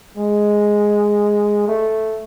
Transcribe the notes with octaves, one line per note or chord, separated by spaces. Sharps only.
G#3
A3